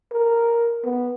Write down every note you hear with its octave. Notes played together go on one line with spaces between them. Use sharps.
A#4
B3